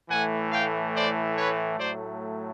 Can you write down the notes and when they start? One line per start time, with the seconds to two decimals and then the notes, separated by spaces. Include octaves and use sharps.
0.10 A2 E3 A3 F#5 G#5
0.52 F5 G5
0.95 C5 D5
1.38 B4 C#5
1.79 A2 F#3 A3 C5 D5